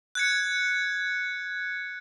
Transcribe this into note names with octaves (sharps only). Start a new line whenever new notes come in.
F#6 G#6 C#7